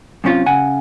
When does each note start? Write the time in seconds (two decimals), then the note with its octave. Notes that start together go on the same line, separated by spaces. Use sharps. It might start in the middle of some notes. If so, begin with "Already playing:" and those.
0.24 F#2 C3 C#4 F4
0.46 C#3 F#5 G#5